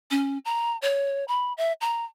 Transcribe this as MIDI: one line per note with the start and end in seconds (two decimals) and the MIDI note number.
0.11 0.38 61
0.45 0.77 82
0.82 1.25 73
1.28 1.53 83
1.57 1.73 76
1.81 2.05 82